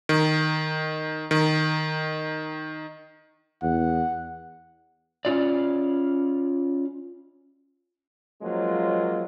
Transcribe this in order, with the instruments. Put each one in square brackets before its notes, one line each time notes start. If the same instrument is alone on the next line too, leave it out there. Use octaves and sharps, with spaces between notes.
[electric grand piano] D#3
D#3
[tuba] E2 [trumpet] F#5
[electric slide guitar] C#4 F4 D5
[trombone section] F3 F#3 G#3 A#3 C#4 F4